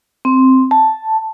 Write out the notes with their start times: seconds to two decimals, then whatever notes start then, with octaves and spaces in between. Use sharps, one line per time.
0.25 C4
0.71 A5